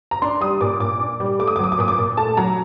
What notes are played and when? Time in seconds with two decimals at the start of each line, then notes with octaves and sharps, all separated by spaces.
0.11 A#5
0.22 D4 C6
0.41 G3 D#6
0.61 A#2 D6
0.80 A#2 D6
1.00 D4
1.20 G3
1.39 A3 D6
1.48 D#6
1.56 D6
1.59 F#3 D#6
1.72 D6
1.78 A#2 D#6
1.88 D6
1.98 A#2
2.17 A3 A5
2.37 F#3 A#5